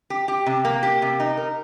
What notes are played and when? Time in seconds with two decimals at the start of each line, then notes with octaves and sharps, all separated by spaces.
0.10 G4
0.28 G4
0.46 C3
0.65 A#3
0.83 G4
1.02 C3
1.20 D#4
1.37 A#4